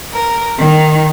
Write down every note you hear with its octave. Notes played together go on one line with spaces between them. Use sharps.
A#4
D#3